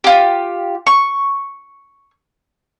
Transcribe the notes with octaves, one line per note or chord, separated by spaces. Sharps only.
F4 G4
C#6